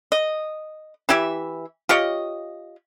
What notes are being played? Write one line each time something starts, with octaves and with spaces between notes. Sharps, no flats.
D#5
E3 E4 G4 E5
F4 G4 C#5 D#5